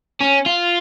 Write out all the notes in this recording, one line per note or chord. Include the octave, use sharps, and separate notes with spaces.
C#4
F4